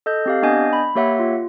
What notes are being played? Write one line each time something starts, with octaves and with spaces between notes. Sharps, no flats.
A4 D#5 G6
C4 G4 F5
B3 D4 D#5 G#5 G6
B5
A#3 G4 C#5 E5 F#5
F4